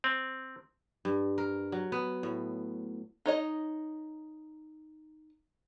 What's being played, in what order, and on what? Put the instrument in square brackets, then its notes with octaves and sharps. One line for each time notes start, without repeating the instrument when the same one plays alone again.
[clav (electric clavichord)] C4
[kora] G2
A#4
F#3
B3
A2
[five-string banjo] D#4 C#5 D#5